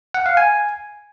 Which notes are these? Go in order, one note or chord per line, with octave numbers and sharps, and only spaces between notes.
F#5
F5
G#5